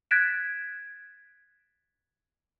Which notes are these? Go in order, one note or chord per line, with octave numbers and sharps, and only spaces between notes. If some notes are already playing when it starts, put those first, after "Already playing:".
F#6 G#6 A6 B6 D7 E7